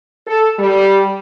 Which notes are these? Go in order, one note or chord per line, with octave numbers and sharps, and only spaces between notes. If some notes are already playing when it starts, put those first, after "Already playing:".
A4
G3